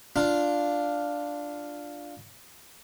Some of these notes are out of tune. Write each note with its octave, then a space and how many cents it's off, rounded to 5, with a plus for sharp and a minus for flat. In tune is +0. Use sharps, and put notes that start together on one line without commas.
D4 +0 F4 +0